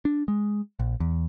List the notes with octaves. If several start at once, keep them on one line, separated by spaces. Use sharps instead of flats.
D4
G#3
A#1
E2